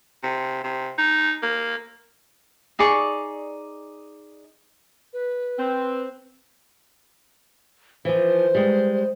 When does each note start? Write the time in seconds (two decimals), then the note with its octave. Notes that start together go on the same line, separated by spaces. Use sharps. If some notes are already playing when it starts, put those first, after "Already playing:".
0.23 C3
0.64 C3
0.98 D#4
1.42 A#3
2.79 D#4 G#4 D5 C#6
5.13 B4
5.58 C4
8.05 E3 F3 C5
8.55 G3 G#3